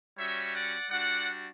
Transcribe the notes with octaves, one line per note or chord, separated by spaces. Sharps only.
G3 C#4 F#4 C#5 E5
D5 F#5
G3 D4 F#4 D5 F#5